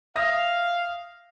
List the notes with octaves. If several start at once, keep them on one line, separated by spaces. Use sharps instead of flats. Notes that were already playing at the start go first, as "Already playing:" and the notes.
E5 F5 D#6 A#6